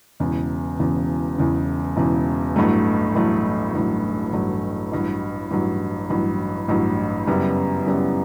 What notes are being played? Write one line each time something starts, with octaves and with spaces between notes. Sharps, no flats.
E1 E2 C#3
E1 E2 C#3
E1 E2 C#3
E1 E2 C#3
A1 G2 F#3 A3
A1 G2 F#3 A3
A1 G2 F#3 A3
A1 G2 F#3 A3
A1 G2 F#3
A1 G2 F#3
A1 G2 F#3
A1 G2 F#3
F#2 C#3 G3 B3 E4
F#2 C#3 G3 B3 E4